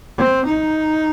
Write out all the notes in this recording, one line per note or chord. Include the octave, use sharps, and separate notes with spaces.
C4
D#4